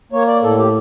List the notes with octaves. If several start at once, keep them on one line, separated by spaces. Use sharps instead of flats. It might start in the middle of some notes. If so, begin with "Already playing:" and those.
A#3 C#5
D5
A2 A4
G4